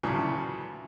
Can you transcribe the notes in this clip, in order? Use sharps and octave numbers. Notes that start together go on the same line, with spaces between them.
D2 A#2 C#3 E3 F#3